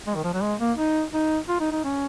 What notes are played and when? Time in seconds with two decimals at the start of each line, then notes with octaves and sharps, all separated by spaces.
0.07 G#3
0.15 D#3
0.24 F3
0.33 F#3
0.42 G#3
0.60 A#3
0.78 D#4
1.13 D#4
1.49 F4
1.61 D#4
1.72 D#4
1.84 C#4